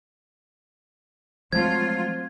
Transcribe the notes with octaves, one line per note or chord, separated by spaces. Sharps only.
F3 F#3 G#3 A3 C4 F4 A5 G#6